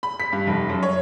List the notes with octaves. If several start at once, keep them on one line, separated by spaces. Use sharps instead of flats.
B5
B6
G2
F1
F#2
C#5